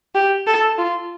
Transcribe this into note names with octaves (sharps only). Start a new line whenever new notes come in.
G4
A4
F4